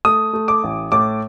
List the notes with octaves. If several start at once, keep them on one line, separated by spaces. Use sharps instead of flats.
A3 D#6
A3
D6
A1
A2 D6